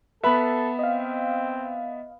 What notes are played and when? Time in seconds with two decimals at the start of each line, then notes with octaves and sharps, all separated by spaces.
0.24 B3 A4 B4 E5 B5
0.79 C4 D#5 F5